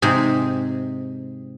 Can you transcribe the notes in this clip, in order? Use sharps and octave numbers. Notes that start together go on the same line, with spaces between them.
G#2 C3 G#4